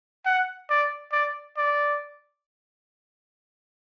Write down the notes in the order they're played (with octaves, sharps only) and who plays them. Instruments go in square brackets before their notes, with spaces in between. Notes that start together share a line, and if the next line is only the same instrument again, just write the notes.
[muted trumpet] F#5
D5
D5
D5